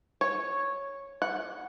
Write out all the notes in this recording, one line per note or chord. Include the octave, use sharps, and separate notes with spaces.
C#5
F#5